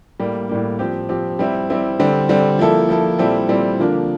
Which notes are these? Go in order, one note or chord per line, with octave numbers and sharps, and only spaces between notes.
A2 G3 A#3
A2 G3 A#3
F3 C4 G4
F3 C4 G4
G3 C4 E4
G3 C4 E4
D3 G3 C4
D3 G3 C4
F3 A#3 E4 A4
F3 A#3 E4 A4
A#2 G3 C4 E4 A4
A#2 G3 C4 E4 A4
D3 F3 A#3 D4 F4